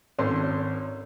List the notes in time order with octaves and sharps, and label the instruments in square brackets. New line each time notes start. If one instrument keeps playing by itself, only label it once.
[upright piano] G#1 C#4 A4 C6